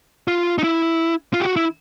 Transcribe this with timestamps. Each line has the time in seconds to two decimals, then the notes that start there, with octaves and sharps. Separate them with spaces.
0.28 F4
0.58 D#4
0.63 E4
1.33 F4
1.40 G4
1.45 F#4
1.56 E4